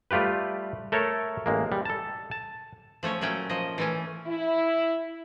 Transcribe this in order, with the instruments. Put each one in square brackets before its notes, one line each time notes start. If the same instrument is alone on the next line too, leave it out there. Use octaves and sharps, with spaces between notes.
[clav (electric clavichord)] G3 A3 F4 G4 B4
A3 A4 A#4 C#5
A1 G#3 A#3
G3
A4 A5
A5
[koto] F3 A3 C#4 C#5
A#2 F#3 A3 C#4 G5
F3 D#5
E3 A3 C#4
[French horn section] E4